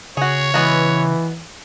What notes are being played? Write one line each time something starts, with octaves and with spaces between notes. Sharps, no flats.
C#3 F#4 G#4 C#5
E3 G#3 B3 F#4